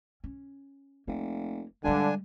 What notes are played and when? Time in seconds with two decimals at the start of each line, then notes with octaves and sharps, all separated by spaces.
0.24 C#4
1.07 F1 A#3
1.84 G2 D3 G3 G#3 D4 G#5